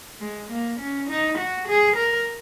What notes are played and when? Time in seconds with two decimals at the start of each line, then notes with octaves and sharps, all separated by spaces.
0.20 G#3
0.50 A#3
0.80 C#4
1.09 D#4
1.38 F#4
1.68 G#4
1.97 A#4